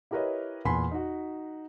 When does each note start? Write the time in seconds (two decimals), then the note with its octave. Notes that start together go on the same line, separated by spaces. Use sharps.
0.11 E4 G4 A#4 B4 C#5 D#5
0.65 E2 A#2 G#5 B5 C6 B6
0.92 D#4 F#4